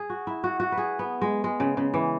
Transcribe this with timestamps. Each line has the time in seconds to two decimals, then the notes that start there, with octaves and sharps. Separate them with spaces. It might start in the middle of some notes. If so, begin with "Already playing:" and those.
Already playing: G#4
0.10 F#4
0.27 E4
0.44 F#4
0.60 F#4
0.72 B4
0.77 G#4
0.99 B3
1.21 G#3
1.44 G#3
1.60 C#3
1.77 C#3
1.94 E3